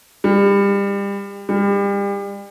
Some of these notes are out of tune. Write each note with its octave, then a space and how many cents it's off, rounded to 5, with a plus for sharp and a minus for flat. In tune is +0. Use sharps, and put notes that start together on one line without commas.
G3 +30
G3 +35